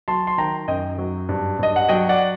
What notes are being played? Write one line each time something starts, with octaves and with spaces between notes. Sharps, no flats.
F#3 A5 C6
C6
D#3 G5 A#5
F#2 D#5 G5
F#3
G2
G2 D#5
F#5
F#3 D#5 G5
D5 F#5